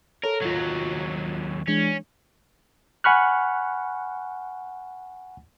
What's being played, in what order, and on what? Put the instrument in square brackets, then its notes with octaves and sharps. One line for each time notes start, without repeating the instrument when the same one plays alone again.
[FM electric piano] A4 C#5 [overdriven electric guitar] A#4
[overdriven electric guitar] D#2 F#3 [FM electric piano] F4 G#6
[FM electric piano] E3 G#3 D4 [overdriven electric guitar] C#4
[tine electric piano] F#5 G#5 B5 C#6 F6 F#6